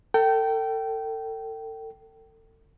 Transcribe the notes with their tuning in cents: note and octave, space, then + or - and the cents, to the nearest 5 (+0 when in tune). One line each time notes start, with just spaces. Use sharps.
A4 +35 G5 -20